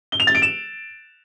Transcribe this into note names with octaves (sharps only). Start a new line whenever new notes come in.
G7
F7
A6
D7
E7